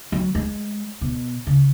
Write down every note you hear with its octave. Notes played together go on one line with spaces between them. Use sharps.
F#3
G#3
B2
C#3